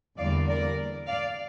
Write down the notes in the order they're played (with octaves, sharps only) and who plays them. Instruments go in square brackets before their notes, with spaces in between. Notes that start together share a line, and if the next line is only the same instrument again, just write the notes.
[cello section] E2 D3 G3 A#3 D5 F5
A#4 D5
D5 F5